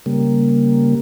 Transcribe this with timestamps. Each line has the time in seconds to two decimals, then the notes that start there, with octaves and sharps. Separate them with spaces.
0.06 C#3 G3 A#3